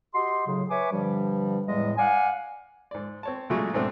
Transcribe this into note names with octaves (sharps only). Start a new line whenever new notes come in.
F#4 G4 D#5 C6
A2 C#3 F#3
B4 C#5 E5 G#5 D6
G2 D3 F3 G3
E2 A2 G3 G#3 D#5
D5 F5 F#5 G#5
G#2 D5
C4 C#5 A5
A#2 C#3 F#3 G#3 A3 F#4
B1 G#2 A3 C4 D4